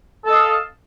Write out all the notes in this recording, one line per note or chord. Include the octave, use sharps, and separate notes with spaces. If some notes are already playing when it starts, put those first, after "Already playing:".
A4 D#5 F5